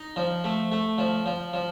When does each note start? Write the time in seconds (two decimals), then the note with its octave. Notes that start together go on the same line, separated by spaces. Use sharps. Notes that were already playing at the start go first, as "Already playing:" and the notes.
Already playing: D#4
0.16 F3
0.44 A3
0.72 A3
0.98 F3
1.26 F3
1.53 F3